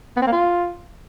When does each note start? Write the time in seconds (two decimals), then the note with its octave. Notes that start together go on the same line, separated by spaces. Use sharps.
0.17 B3
0.22 C4
0.27 A#3
0.32 F4